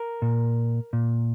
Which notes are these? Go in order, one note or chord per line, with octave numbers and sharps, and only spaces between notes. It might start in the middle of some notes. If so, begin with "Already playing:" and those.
Already playing: A#4
A#2
A#2